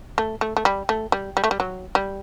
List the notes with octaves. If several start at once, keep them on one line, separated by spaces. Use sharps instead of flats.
A3
A3
A3
G3
A3
G3
G3
A3
G3
F#3
G3